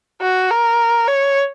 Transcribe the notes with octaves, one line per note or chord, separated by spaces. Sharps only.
F#4
A#4
C#5